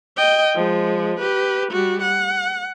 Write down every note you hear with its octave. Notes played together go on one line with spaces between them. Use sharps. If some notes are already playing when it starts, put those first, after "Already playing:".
D#5 G5
F3 G#3
G4 B4
G3 F#4
F#5